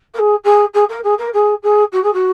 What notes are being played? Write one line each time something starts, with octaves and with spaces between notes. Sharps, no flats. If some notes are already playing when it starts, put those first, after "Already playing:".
A#4
G#4
G#4
G#4
A#4
G#4
A#4
G#4
G#4
F#4
G#4
F#4